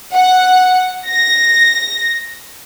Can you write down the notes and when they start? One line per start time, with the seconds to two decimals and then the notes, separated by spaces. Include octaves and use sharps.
0.13 F#5
1.09 A#6